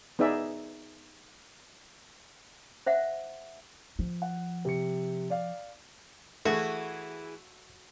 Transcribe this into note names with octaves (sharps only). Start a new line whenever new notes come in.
B3 D#4 G#4 D5 E5
C5 E5 F#5
F3
F#5
C3 C#7
D5 F5
E3 A3 E4 F#4 G#4